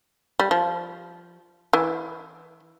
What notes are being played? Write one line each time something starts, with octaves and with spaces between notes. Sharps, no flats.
G3
F3
E3